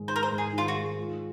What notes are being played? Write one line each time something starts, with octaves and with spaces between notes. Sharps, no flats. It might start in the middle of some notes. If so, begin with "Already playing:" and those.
Already playing: G#2 D#3 G#3
D#4 C5
A#4
C5
G#2
G#4
D#3 F4
F#4
G#3
F4